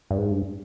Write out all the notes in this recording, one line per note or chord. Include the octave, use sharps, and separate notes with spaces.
G2
G#2
G2